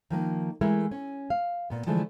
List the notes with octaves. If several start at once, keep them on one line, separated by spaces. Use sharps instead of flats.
D#3 F3 A#3
E3 G#3 A3 E4 A#4
C#4
F5
A#2 B3
D3 E3 F3 G#3 A3